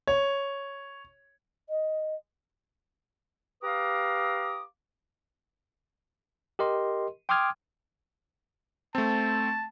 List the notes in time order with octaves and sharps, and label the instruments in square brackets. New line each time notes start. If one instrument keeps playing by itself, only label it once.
[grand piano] C#5
[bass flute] D#5
[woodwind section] G4 B4 F5 A#5 D6 D#6
[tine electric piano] G4 A#4 D#5 C6
G5 C6 D6 D#6 F6 G#6
[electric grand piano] A3 C4 [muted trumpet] A5